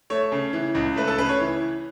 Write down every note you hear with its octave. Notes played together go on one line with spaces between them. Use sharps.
A3 C#5
C#3
E3
C#2
A3 B4
A4
C#3 B4
C#5
E3